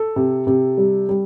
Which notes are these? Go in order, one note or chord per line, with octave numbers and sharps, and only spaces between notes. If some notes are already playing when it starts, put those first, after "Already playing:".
Already playing: A4
C3
C3
G3
G3